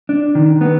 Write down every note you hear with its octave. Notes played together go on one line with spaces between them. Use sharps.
D4
D#3
B3